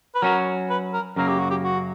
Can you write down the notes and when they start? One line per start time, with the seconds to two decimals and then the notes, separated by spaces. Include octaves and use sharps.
0.15 B4
0.22 F#3 C#4 F#4 A#4
0.70 B4
0.93 A#4
1.16 F#2 C#3 F#3 A#3 A#4
1.28 G4
1.39 F#4
1.50 G4
1.64 F#4